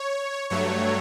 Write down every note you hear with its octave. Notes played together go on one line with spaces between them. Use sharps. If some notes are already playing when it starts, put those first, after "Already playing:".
Already playing: C#5
G2 F#3 A3 C#5